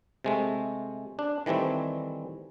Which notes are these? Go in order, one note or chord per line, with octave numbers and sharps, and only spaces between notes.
C3 G#3 A3
D4
D#3 E3 G3 A3 C4